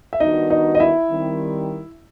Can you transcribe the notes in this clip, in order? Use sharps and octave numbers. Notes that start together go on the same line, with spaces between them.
E5
D#3 G3 B3 D4 D#4 F#4 D#5
D#4 D#5
D#5
E4 E5
D#3 G3 C4